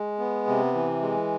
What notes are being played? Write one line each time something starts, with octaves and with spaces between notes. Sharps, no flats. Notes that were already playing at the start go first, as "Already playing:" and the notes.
Already playing: G#3
B3
C3
E3
G#3